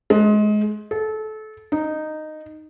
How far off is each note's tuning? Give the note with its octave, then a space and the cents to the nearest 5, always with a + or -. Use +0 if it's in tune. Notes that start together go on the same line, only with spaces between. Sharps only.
G#3 +25
A4 -25
D#4 -10